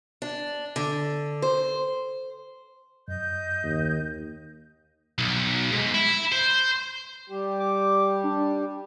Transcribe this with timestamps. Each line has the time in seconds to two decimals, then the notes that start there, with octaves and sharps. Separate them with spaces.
0.22 D4
0.76 D3
1.42 C5
3.08 F#2 D#5 G6
3.64 D#2
5.18 B1
5.72 G#2
5.95 E4
6.32 C5
7.29 G3 G4
7.60 D6
8.24 D4